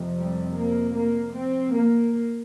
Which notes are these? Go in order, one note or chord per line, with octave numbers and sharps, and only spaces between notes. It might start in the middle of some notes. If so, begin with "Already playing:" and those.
Already playing: F2 C3
G3
A#3
A#3
C4
A#3